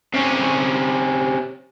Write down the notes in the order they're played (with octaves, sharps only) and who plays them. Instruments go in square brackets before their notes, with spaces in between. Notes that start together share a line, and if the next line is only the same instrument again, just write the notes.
[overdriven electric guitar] C3 C#4